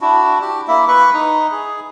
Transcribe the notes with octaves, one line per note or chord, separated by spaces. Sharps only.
D4 E4 F#4
G4
A#3 E4 E5
B4 B5 C#6
D#4
G#4